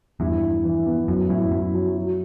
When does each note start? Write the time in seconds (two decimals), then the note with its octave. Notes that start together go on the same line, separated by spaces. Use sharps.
0.20 E2 G2 E4
0.42 E4
0.64 E3
0.86 B3
1.08 F#2 F#3
1.30 F#2 A2 E4
1.51 F#2 E4
1.74 F#3
1.96 F#3